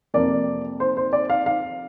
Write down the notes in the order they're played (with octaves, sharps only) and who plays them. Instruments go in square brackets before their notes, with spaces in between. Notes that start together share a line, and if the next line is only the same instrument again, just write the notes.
[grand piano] F2 C3 A#3 D5
C5
C5
D5
F5
F5